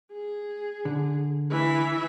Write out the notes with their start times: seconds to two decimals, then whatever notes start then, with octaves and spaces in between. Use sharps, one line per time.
0.13 G#4
0.85 D3
1.51 E3 E5